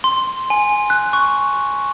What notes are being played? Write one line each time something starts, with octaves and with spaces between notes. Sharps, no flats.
C6
G#5
F#6
C#6